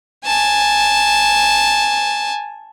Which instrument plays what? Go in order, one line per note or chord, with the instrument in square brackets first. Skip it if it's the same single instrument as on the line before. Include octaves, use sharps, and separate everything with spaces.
[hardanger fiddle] G#5 A5